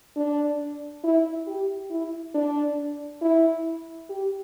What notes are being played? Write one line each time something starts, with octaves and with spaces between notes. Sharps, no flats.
D4
E4
G4
E4
D4
E4
G4